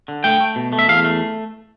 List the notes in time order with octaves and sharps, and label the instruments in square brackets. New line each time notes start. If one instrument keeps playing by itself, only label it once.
[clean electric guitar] D3
A3 G5
A3
B2
A3
E5
E2 F5
A3